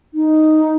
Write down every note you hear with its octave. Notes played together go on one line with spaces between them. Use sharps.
D#4